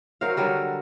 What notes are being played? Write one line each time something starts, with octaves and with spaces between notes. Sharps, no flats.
F#3 A#4 C5 F5
D3 F#3 G3 A#4